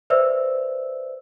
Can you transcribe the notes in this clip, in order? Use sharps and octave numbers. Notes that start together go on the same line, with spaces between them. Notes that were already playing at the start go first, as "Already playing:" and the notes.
B4 C5 D5 E5 E6